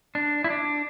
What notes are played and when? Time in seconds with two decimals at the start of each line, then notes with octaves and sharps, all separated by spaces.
0.15 D4
0.44 E4
0.50 D4